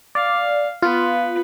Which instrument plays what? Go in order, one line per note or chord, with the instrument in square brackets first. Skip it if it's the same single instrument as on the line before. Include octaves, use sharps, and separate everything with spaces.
[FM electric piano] D5 [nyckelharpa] F5
[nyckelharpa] B3 B4 [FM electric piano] F4